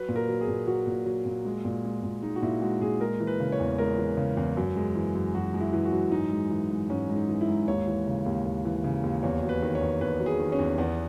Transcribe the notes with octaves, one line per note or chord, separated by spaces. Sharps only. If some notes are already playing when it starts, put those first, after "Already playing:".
Already playing: F#3 B4
A#2
A#4
F#3
G#4
A#2
F#3 F#4
A#2
F#3
A#2
G#3
A#2
G#3
A#2
G#3 D#4
F#4
A#2 E4
G#3 F#4
A#2 G#4
G#3 A#4
E3
B4
C#3
C#5
E2
G#3 A#4
E3
C#3
E2
F#2
G#3
E3
F#2
F#2 F#4
G#3
E4
E3
F#4
F#2
G#2 D#4
G#3
E3
G#2
G#2 C#4
G#3
D#4
E3
E4
G#2
D#2 C#5
E3
C#3
D#2
D#2
E3
C#3
D#2
E2 C#5
F#3
B4
D#3
C#5
E2
E2 B4
F#3
G#4
D#3
C#4
E2
E2 B3